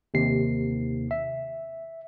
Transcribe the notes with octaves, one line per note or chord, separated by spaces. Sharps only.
D#2 C3 C7
E5